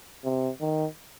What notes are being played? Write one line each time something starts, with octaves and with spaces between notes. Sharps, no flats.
C3
D#3